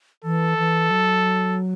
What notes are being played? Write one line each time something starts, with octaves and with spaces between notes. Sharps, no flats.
E3 A4
E3
F#3